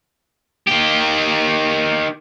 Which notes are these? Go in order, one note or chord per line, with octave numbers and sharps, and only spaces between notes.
D#3 G4